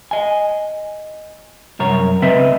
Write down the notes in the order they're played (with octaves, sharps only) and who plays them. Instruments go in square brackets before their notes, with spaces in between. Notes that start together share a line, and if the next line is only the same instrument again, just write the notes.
[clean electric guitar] D#5 G#5
C2 F#2 A#4 C#5
C#2 C#3 C4 B4 D#5 E5